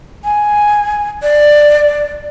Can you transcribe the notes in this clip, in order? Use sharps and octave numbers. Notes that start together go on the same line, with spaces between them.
G#5
D5